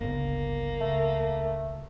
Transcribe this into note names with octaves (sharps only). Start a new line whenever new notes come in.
G1 C#2 A#3
C#2 A3